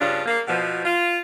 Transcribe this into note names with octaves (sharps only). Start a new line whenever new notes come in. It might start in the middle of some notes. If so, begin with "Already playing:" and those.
G2 C#3 D4 F4
A#3
B2 F3
F4